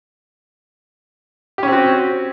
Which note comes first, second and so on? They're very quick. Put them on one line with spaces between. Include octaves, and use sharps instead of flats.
G4 C#4 C4 F#4